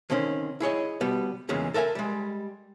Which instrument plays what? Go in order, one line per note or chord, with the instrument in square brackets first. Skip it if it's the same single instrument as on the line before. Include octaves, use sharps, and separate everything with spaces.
[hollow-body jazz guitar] D3 D#3 C4 C#4
E4 G#4 C#5 D#5
B2 G3 B3
E2 A#2 C#3 E3 G#3
A4 A#4 E5 F#5 G#5
G3 G#3